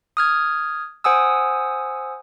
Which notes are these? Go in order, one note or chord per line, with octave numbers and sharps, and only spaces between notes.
D#6 F6 G#6
C5 F#5 G#5 D#6 E6